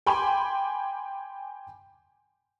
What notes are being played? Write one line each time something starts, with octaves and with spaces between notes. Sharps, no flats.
G5 G#5 B5 C6 D6